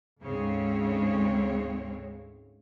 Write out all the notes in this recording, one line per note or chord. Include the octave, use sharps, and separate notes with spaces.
D2 G#2 C#3 G#3 C4 C#5